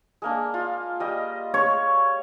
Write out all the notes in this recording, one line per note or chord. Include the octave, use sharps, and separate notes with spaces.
G#3 A#3 D4
F4
G3 D#5
C#5